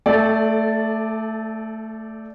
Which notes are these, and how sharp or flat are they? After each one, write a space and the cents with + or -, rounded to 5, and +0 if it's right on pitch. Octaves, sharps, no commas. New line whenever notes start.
A3 +10 A4 -25 D5 +0